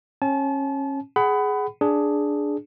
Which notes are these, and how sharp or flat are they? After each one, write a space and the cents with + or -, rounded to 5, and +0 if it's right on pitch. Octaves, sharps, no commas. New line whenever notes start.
C#4 -25 A5 -35
G#4 +10 F#5 +25 B5 +20
D4 +0 G#4 +5